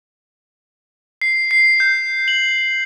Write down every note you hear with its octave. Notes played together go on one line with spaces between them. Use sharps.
C7
C7
G6
F#7